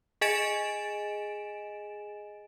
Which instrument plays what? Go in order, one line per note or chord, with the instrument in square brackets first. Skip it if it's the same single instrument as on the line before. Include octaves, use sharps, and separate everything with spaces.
[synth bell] G#4 D#5 G#5 A6 D7 E7